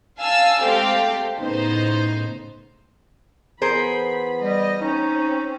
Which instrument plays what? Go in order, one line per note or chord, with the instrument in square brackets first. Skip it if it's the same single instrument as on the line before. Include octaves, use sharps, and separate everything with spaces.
[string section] F5 G#5 A5 E6
G#3 A3 C4 G4 A4 F5
A2 C#3 B3 D#4 C5
[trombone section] E3 B3 [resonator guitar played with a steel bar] G#4 A#4 C5 [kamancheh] B5
[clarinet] G3 [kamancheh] D#5
[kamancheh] C4 C#4 [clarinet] D#4